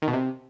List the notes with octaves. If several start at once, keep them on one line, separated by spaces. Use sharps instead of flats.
D#3
B2
C3